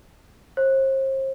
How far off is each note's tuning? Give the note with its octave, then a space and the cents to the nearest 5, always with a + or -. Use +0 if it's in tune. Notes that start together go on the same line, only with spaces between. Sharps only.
C5 +40